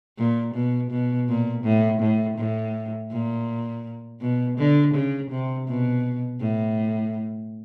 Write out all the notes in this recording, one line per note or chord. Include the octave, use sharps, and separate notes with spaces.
A#2
B2
B2
A#2
A2
A2
A2
A#2
B2
D3
C#3
C3
B2
A2